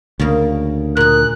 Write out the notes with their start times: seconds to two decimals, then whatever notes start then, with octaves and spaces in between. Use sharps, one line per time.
0.20 D2 C#3 A#3
0.97 A#2 G#4 A#4 F#6